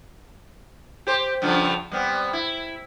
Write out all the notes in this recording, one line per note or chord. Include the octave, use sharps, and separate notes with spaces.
G4 C5
G2 C#3 F3
G3 B3 C4
E4